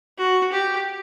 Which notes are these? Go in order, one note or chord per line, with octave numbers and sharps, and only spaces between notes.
F#4
G4